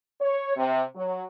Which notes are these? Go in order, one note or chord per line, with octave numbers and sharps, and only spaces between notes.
C#5
C3
F#3